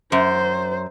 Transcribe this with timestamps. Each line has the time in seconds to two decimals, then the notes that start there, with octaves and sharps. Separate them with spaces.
0.12 F#2 C5